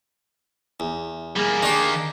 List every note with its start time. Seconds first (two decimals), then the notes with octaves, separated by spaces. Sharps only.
0.80 E2
1.36 G3 A#3 G#4
1.63 D#3 A#3 D4 G4